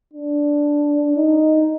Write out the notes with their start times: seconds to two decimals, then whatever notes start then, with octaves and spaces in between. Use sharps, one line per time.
0.13 D4
1.17 D#4